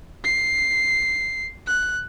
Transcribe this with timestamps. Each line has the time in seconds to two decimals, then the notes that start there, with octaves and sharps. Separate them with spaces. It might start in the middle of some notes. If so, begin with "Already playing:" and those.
0.24 C7
1.67 F#6